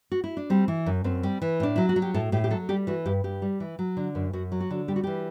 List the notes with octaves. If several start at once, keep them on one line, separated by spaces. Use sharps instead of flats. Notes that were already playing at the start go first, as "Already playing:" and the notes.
F#4
E4
D4
G3 C4
E3
F#2
F#2 C4
G3
E3
A2 D4
F#3 E4
F#4
F#3
G4
A2 A4
A2 G4
G4
F#3 A4
G3 G4
E3 F#4
G2 G4
G2 G4
G3
E3
F#3
D3
F#2
F#2 F#4
F#3
F#4
D3
G3 G4
F#4
E3 G4